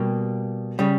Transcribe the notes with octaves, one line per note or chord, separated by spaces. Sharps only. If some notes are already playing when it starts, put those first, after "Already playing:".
Already playing: B2 G3 A#3 G4
C#3 G3